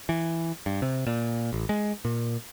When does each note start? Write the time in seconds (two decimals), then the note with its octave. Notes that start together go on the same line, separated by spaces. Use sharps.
0.09 E3
0.66 G2
0.82 C3
1.07 A#2
1.53 A1
1.69 G#3
2.05 A#2